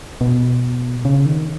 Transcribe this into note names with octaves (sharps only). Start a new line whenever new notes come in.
B2
C#3
D#3